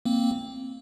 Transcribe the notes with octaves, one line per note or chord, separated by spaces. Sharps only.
A#3 C4